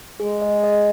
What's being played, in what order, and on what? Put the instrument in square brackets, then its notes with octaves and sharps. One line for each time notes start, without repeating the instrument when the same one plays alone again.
[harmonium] G#3 [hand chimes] G#4
[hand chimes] D#5
D#5